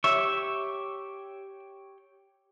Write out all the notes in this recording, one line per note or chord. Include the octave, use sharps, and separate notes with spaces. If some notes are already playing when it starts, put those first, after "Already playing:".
G4 C#5 E5 C#6